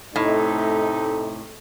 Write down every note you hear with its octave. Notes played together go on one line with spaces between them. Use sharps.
A2 C3 A3 D#4